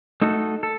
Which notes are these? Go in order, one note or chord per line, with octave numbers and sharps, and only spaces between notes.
A3 D#4 F#4 A4
A4